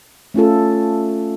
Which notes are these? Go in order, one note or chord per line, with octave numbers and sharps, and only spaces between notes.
A3 C#4 F4 A4